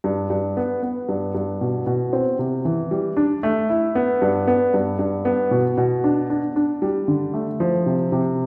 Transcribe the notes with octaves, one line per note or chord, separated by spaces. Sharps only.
G2
G2
B3
B3
G2
G2
B2
B2
C4
C3
E3
G3
D4
A3
E4
B3
G2
B3
G2
G2
B3
B2
B2
D4
D4
D4
G3
D3
A3
F3
C3
C3